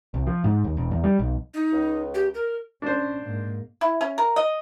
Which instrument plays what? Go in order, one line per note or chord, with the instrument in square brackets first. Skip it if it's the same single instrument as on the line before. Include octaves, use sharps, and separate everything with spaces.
[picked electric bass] C2
F3
G#2
D#2
E1
E2
G3
B1
[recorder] D#4
[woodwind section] C#2
[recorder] G4
A#4
[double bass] C#4 [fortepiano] D4 C5
[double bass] G#2 A#3
[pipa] E4
C#4
A#4
D#5